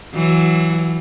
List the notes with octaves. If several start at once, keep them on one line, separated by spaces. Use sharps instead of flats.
E3 F#3